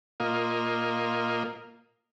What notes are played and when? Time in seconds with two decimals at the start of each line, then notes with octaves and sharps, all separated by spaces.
0.20 A#2 A#3 F4 D#5